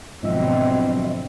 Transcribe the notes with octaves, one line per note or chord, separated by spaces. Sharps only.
G#2 B2 D3 F3 F#3 C4 D#5 E5